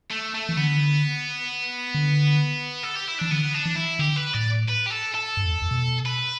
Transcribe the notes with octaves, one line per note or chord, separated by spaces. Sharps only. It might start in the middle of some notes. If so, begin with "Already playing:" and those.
A3
A3
E3
D3 B3
D3
A4
G4
E4
E3 D4
D3 B3
D4
E3
E4
D3 G4
B4
A2 D5
B4
G4
A4
A4
G2
E2
E2
B2
B4